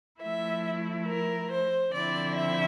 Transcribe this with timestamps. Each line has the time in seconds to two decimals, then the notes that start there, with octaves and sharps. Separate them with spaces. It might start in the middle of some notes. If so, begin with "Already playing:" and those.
0.22 F3 A3 E4 E5
1.08 A#4
1.50 C5
1.93 D3 F3 C4 E4 D5
2.36 E5